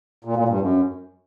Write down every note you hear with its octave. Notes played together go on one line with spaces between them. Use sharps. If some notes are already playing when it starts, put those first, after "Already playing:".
A#2
A#2
G2
F#2